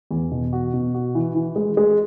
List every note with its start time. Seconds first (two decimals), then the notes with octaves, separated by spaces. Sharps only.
0.11 E2
0.32 B2
0.53 F#4
0.74 B2
0.94 F#4
1.15 E3
1.35 E3
1.56 G#3
1.77 G#3